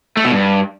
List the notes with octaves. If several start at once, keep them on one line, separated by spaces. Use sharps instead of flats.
A3
B2
G2